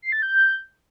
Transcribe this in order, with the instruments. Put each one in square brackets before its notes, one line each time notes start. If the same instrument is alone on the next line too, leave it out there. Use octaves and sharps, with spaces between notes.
[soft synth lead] C7
A6
G6